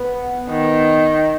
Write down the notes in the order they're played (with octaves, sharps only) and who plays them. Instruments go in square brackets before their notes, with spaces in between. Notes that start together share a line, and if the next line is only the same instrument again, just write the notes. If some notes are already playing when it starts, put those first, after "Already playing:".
Already playing: [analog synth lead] B3
[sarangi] D#3